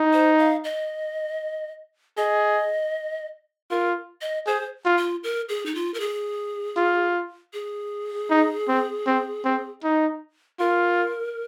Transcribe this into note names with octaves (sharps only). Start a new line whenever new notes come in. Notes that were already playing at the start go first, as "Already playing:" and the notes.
Already playing: D#4
C5
F5
D#5
G#4 D#5
F4 A#4
D#5
G#4 C5
F4
F4
A#4
G#4
D#4
F4
A#4
G#4
F4
G#4
D#4
C4
C4
C4
D#4
F4 A#4